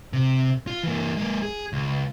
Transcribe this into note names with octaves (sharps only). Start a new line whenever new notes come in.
C3
F4
E3 A#3
G#3 A#3
G#4
C#2